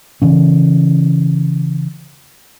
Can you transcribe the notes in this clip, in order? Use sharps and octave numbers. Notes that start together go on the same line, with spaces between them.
C#3 E3 C#4